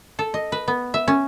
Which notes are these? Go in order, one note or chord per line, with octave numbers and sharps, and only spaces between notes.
A4
D#5
B4
B3
E5
C#4